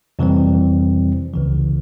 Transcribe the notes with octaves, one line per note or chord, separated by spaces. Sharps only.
F2 C3 E3 G3 C4
C#2 C#3 E3